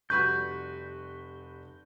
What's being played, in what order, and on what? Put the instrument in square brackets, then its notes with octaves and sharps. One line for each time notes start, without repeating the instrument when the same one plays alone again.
[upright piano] F1 G3 B5 [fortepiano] F#4 B4 C#6 [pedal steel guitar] G6